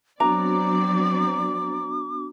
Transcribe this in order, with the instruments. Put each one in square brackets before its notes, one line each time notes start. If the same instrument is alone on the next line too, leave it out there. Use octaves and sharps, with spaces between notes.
[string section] F#3 C4 D5 [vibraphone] B3 D4 F#4 [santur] A#5 [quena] D6